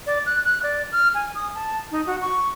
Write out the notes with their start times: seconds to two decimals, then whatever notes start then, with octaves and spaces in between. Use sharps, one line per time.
0.07 D5
0.26 F#6
0.44 F#6
0.63 D5
0.92 F6
1.15 G#5
1.35 D#6
1.55 A5
1.91 D#4
2.06 F#4
2.21 C#6